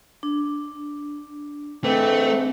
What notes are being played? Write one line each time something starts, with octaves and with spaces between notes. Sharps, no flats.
D4
G#2 E3 A3 C4